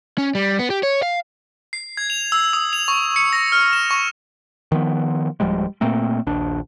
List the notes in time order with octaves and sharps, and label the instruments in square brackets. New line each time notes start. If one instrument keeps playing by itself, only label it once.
[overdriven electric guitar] C#4
G3
B3
G4
C#5
F5
[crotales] C7
G#6
F7
E6
D#6
F7
C#6
C#7
A#6
F6
E7
C#6
[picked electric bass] D#3 F3 B3
D1 F3 G3 G#3
A#2 A3 A#3 C4
A#1 D#2 D4